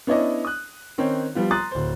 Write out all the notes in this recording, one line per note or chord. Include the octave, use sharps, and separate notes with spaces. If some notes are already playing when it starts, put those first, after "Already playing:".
B3 C#4 D4 E4 D5 D#5
D#6 F#6
D#3 C4 C#4 D#4
F3 G3 B3 F4
A#5 C6 D#6 F#6 A6
D1 C5